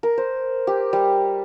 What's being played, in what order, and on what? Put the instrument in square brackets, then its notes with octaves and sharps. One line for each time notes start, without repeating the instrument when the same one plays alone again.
[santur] A#4
C5
G4
G3